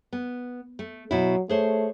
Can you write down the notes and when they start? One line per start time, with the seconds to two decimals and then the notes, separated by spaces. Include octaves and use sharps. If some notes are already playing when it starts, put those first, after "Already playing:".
0.13 B3
0.79 A3
1.11 B2 F#3 E4
1.49 A3 G#4 C5 C#5